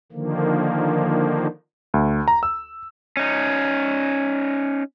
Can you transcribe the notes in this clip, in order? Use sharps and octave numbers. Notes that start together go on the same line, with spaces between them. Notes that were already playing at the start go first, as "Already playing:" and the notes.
D3 D#3 F3 A#3
D2
A#5
E6
C#4 D#4